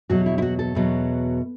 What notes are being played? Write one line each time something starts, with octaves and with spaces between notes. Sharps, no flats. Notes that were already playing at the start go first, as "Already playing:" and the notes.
E2 B2 F#3 F#4
E4
E4
F#4
A4
E2 B2 F#3